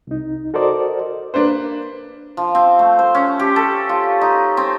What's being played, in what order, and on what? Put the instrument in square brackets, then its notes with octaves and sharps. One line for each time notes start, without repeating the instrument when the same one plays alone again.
[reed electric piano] C2 D#4
F#4 A4 A#4 C5 D5 D#5
[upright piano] A#3 D4 B4 C5
[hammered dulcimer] F3
C4
A3
C5
C#4
G4
A4
F4
D#4
C4